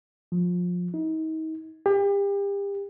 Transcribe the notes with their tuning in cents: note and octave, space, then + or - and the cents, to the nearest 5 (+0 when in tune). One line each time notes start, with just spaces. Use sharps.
F3 +25
D#4 +35
G4 +35